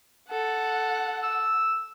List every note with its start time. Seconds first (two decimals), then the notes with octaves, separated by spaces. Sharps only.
0.29 A4 F#5
1.23 E6